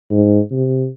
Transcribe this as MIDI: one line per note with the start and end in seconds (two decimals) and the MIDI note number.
0.10 0.39 44
0.51 0.88 48